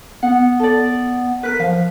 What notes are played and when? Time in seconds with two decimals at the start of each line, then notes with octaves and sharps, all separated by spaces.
0.23 B3 F#5
0.59 A4 D5
1.43 A#4 B4 B6
1.60 F3 F5